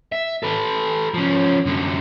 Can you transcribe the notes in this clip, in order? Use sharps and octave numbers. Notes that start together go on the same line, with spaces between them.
E5
A4 B4
F3 C#4
F#2 D3